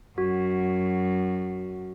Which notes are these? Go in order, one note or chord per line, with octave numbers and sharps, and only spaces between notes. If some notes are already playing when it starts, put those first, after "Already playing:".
F#2 F#4